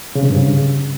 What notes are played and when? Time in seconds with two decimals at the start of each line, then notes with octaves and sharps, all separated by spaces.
0.15 C#3
0.23 C3
0.30 G2
0.37 C#3